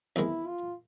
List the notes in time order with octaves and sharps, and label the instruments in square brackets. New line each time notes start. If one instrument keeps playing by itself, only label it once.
[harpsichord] E2 C3 D#3 G#3 [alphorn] E4
[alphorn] F4